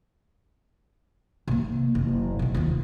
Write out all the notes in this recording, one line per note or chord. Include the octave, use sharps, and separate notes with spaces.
C3 A#3
F#1
C3 D#3
D#2 F4